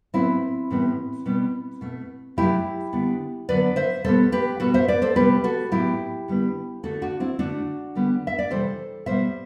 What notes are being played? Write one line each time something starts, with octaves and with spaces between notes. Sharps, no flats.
A2 F#3 B3 C4 E4
A2 E3 G3 B3
B2 G3 B3
B2 A3
C3 F#3 A3 E4 G4
D3 G3 B3
D3 F#3 B3 B4 D5
C5 E5
B2 G3 B3 A4 C5
G4 B4
B2 G3 B3 F#4 A4
C5 E5
B4 D5
A4 C5
C3 G3 B3 G4 B4
F#4 A4
A2 F#3 B3 E4 G4
D3 G3 B3
D3 A3 F#4 A4
D4 F#4
C4 E4
D3 A3 D4 F#4
D3 G3 B3
E5
D5
C3 E3 G3 A4 C5
B2 G3 B3 C5 E5